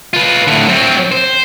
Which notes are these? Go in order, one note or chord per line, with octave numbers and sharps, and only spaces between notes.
F4 B4
A2 D3
F#3 C4
C5